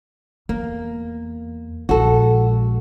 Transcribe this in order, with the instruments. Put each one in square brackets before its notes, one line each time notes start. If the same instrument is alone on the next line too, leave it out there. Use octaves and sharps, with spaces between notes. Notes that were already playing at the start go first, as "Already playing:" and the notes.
[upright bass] E2 [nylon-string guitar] A#3
[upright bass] A#1 G#3 [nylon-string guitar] F#4 A4